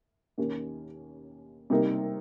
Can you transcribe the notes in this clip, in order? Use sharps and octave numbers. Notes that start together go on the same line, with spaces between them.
D#2 D#3 A#3 C#4 G4
C3 G3 A#3 D#4 A#4